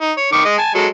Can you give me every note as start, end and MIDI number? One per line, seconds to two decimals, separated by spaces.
0.01 0.12 63
0.17 0.30 73
0.33 0.44 51
0.33 0.44 85
0.33 0.44 86
0.45 0.57 56
0.45 0.57 75
0.58 0.70 80
0.58 0.70 81
0.75 0.87 54
0.75 0.87 56
0.75 0.87 69